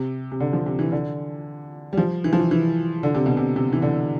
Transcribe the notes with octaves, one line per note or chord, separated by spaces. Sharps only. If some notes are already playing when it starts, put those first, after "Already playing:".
Already playing: C3
C3
D3
F3
C3
E3
D3
G3
F3
E3
F3
E3
E3
D3
C3
B2
C3
C3
E3
D3